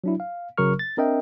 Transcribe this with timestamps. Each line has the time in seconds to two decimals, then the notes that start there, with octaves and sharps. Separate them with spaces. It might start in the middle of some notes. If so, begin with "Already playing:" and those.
0.04 F#3 D4 E4
0.20 F5
0.58 G1 C#3 F#3 A#4 C#6 F6
0.79 A6
0.97 C4 D4 A#4 D#5 E5 G5